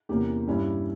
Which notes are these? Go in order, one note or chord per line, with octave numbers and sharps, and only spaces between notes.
E2 C3 E3 A#3 C#4 G4
G2 G3 C#4 E4